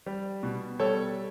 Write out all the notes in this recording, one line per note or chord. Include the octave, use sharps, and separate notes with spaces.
G3
B2
G3 A4 C#5